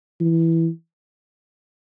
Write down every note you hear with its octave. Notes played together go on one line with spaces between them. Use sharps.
E3